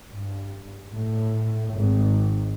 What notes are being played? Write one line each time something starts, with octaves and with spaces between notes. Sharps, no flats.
G2
A2
G#1